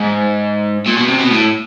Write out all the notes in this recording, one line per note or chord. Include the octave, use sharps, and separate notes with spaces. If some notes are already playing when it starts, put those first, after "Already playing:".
Already playing: G#2
A#2
B2
C3
B2
A2